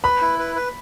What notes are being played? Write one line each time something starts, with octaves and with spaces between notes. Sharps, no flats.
B4 B5
E4
B4
B4